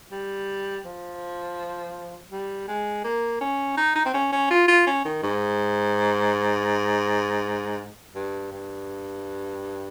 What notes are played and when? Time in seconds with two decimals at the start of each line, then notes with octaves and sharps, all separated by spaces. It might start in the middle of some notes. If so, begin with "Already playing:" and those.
0.12 G3
0.85 F3
2.32 G3
2.68 G#3
3.04 A#3
3.41 C#4
3.77 D#4
3.96 D#4
4.06 C4
4.14 C#4
4.32 C#4
4.50 F4
4.68 F4
4.87 C#4
5.05 D#3
5.23 G#2
8.15 G2
8.52 G2